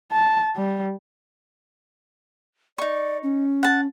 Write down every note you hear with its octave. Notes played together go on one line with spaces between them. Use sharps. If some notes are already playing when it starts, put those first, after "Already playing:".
A5
G3
D#4 D5 C#6
C#4
F#5 A5